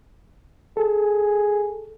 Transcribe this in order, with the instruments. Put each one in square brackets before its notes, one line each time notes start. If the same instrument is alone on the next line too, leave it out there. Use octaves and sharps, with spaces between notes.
[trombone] G#4 [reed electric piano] A4